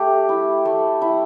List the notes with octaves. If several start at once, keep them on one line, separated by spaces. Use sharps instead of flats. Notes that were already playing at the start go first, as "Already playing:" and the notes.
Already playing: A3 G4
E4
A3
E4